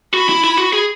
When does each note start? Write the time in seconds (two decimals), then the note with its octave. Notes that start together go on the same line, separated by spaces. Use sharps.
0.14 F#4 B5
0.29 E4
0.44 E4
0.58 F#4
0.73 G#4